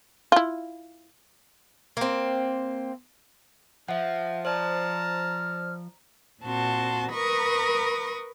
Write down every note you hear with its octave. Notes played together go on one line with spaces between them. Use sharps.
E4 F4
A#3 C4
F3 E5 F#5
C5 D5 A5 A#5 F6
A#2 C4 F#4 A5 C6
A#4 B4 B5 C#6 D#6 A#6